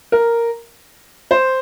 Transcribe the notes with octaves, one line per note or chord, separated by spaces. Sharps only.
A#4
C5